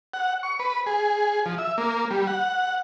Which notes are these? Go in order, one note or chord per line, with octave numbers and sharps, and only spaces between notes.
F#5
C#6
B4
G#4
F3
E5
A#3
G3
F#5